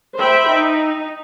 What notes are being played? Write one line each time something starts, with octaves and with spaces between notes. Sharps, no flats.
C5 E5 G5 B5
D#4